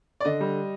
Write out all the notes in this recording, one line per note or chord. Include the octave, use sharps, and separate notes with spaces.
D5
D3 D#5
G3